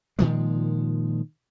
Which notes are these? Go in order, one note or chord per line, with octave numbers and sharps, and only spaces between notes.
A#2 D#3 F3 G#3